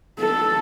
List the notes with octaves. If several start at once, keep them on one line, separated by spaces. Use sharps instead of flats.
A4